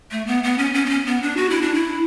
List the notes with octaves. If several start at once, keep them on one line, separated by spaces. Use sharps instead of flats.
A3
B3
B3
C#4
C#4
B3
C#4
B3
D4
F#4
E4
D4
E4